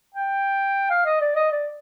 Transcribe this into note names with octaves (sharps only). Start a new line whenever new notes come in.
G5
F5
D#5
D5
D#5
D5